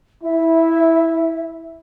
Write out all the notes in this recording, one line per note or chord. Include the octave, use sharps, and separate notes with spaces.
E4 E5